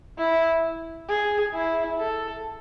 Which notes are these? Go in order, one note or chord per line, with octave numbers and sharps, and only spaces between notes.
E4
G#4
E4
A4